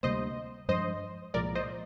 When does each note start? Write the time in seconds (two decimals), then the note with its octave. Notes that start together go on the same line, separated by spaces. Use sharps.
0.03 D2 C3 G3 A#3 C5 D#5
0.68 G2 F3 G#3 D4 C5 D#5
1.34 C2 A#2 F3 G#3 A#4 D5
1.55 C5 D#5